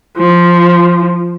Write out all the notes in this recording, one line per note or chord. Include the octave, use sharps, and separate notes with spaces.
F3